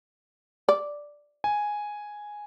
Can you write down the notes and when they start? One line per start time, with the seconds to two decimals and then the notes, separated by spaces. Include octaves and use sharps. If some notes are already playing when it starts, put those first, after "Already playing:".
0.69 D5
1.44 G#5